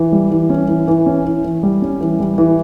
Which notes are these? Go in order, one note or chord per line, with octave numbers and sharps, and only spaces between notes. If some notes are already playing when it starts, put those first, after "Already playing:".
Already playing: E3
G3
E3
C#4
E3
E3
C#4
E3
E3
G3
C#4
E3
G3
E3